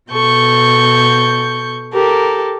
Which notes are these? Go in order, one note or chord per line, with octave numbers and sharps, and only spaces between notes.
B2 A4 C#6 G6
G4 A4 A#4